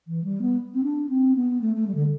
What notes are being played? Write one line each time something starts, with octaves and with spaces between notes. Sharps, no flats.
E3
G3
B3
C4
D4
C4
B3
A3
A3
G3
D3